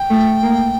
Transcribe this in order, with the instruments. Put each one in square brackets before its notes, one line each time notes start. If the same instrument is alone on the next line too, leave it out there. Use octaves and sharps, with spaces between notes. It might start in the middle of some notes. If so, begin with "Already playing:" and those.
Already playing: [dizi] G5
[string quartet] A3
A#3